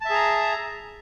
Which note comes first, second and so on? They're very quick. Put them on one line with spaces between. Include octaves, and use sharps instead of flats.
A5 E5 G#4 A#5